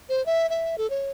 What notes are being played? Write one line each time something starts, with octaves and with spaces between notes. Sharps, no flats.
C5
E5
E5
A4
C#5